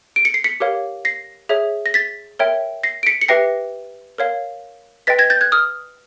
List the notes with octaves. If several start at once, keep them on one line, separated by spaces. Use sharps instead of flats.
D7
C#7
C7
B6 C#7
G4 A#4 C#5 F5
A#6 C7
G#4 C#5 E5
A#6
A6 B6
A#4 C#5 E5 G5
A#6 C7
D7
B6 C#7
C#7
G4 B4 E5 G5 A#6 C7
A#4 C#5 F5
B4 D#5 G5 A6 B6
G#6 A#6
G6 A6
F#6 G#6
D#6 F6